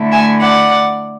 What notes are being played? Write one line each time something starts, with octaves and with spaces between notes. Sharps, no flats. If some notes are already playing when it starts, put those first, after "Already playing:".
Already playing: D3 A3 E4
E5 G#5
D5 F#5